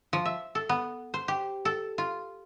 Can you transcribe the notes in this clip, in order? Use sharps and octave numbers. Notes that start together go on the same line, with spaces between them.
F3
E5
A4
B3
C5
G4
A4
F4